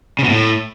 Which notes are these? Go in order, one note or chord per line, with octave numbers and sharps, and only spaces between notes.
C#3
B2
A2